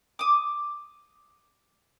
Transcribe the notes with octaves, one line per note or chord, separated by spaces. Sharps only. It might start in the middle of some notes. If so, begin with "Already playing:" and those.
D6 D#6